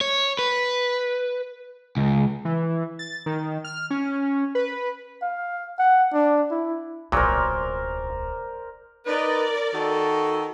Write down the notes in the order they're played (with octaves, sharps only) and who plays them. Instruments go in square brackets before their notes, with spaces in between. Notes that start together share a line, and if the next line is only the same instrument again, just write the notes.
[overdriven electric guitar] C#5
B4
C#2
[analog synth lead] E3
A6
D#3
F6
C#4
B4
[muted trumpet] F5
F#5
D4
E4
[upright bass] D1 B1 [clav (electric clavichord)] A#2 F#3 [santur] A#4 C5 D5
[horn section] D#4 B4 [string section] A#4 D5
[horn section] D#3 F#4 A4